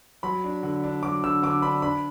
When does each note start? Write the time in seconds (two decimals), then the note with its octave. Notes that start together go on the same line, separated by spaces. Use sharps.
0.23 F#3 B5
0.44 D4
0.63 D3
0.84 D4
1.03 F#3 D6
1.24 D3 E6
1.43 D3 D6
1.62 D4 B5
1.82 D4 B5